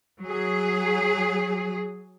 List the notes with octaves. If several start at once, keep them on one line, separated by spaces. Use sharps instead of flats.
F#3 G#4